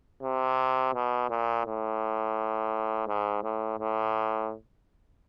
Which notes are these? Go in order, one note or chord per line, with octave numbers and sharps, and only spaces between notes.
C3
B2
A#2
A2
G#2
A2
A2